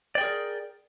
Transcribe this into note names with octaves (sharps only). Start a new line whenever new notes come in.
G#4 A#4 D5 G5